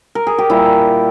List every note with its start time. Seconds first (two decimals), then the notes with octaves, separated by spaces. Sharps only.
0.15 A#4
0.27 G#4
0.38 G4
0.50 A#2 G3 E4